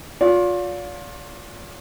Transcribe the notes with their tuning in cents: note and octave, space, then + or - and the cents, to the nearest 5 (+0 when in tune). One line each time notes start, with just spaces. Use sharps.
F4 +30 D5 -40